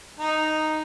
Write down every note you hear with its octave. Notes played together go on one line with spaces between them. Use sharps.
D#4